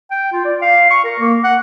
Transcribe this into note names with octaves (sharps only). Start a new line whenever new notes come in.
G5
F4
D5
F5
C#6
A#4
A#3
F#5